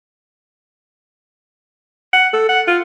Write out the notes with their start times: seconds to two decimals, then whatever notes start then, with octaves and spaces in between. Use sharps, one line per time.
2.13 F#5
2.33 A4
2.49 F#5
2.68 F4